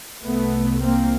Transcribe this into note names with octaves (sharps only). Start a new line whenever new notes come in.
C2 C3 A3 B3
A#3 C4